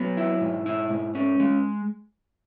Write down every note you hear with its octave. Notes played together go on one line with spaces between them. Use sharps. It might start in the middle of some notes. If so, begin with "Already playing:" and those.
Already playing: F#3 B3
E4
G#2
E4
G#2
C#4
G#3